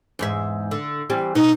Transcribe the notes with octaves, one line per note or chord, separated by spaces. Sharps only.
E2 G#2 E5
D3
E3 G3 C4
B2 D#4